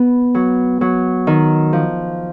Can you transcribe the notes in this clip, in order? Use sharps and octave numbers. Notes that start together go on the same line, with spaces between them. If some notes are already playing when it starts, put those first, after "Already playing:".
Already playing: B3
F#3
F#3
D#3
F3